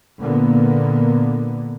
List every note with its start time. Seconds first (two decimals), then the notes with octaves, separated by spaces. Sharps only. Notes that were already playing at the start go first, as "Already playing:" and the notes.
0.20 A#2 D3 A#3 B3